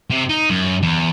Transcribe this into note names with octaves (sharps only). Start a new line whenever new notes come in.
C3
D#4
F#2
E2